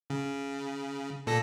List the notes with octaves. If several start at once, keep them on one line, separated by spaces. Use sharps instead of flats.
C#3
A#2 A4 A#6